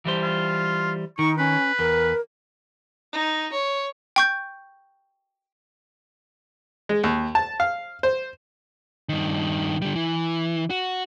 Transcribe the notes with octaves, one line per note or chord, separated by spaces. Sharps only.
E3 G3 C5
F4
D#3 D#4 C#6
C#4 B4
E2 A#4
D#4
C#5
G5 C#6 G6
G#3
D#2
A5
F5
C5
G2 D#3
D3 G3
E3
F#4